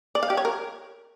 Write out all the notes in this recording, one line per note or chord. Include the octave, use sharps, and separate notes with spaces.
D5
F5
G4
C#5
A#4